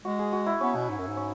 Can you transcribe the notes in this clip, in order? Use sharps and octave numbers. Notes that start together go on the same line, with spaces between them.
G#3 F#4
G#4
F#4
E4
B3 C#4
B2
G#2
F#2
G#2
C#4